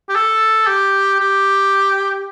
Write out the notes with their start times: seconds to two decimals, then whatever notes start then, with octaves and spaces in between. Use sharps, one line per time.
0.09 G4
0.15 A4
0.67 G4
1.20 G4